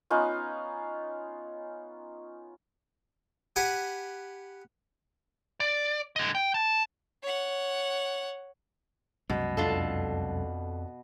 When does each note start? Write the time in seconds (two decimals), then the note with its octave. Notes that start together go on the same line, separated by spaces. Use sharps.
0.10 B3 C#4 D#4 F4
3.56 G4 B4 F#5 G#5
5.60 D5
6.16 D3 D#5
6.35 G5
6.54 A5
7.23 C#5 F#5
9.30 C2 F#2 B2 G#3
9.57 F2 D4 F4 A4